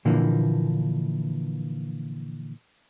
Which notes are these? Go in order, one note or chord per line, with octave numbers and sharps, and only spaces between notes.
A#2 D3 E3 F3 A#3